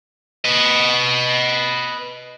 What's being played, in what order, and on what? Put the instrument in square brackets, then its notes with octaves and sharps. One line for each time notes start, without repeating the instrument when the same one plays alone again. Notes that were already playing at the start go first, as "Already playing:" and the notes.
[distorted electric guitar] B4 D#5